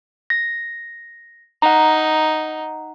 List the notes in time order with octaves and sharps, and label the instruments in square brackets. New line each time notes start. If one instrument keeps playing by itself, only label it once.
[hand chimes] A#6
[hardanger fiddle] D#4 [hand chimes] F#5 A#5